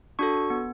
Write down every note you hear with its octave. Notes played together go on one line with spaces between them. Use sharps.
D4 F#4 A4 C#6
B3